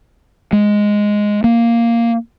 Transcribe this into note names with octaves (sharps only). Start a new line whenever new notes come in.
G#3
A#3